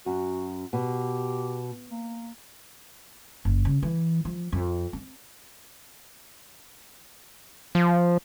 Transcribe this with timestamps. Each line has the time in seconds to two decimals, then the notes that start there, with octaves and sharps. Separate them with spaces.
0.06 F#2 F#4
0.73 B2 G4
1.91 A#3
3.45 F#1
3.65 C#3
3.83 E3
4.25 F3
4.52 F2
4.93 C4
7.75 F3